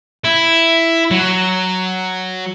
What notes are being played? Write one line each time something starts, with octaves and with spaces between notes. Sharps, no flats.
E4
F#3